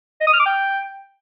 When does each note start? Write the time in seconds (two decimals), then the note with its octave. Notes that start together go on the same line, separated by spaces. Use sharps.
0.21 D#5
0.27 D#6
0.33 F6
0.40 D6
0.46 G5